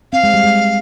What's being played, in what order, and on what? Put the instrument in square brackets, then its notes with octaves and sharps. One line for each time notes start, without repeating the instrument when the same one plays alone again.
[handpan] C4 [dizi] F5
[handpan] G#3
G3
G#3